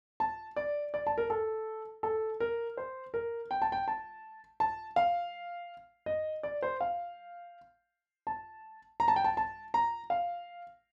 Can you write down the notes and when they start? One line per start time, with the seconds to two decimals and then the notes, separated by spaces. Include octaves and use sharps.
0.20 A5
0.56 D5
0.94 D5
1.07 A5
1.18 A#4
1.30 A4
2.03 A4
2.40 A#4
2.77 C5
3.14 A#4
3.51 G5
3.62 A5
3.72 G5
3.88 A5
4.60 A5
4.96 F5
6.06 D#5
6.43 D5
6.63 C5
6.81 F5
8.27 A5
9.00 A#5
9.08 A5
9.16 G5
9.24 A5
9.37 A5
9.74 A#5
10.10 F5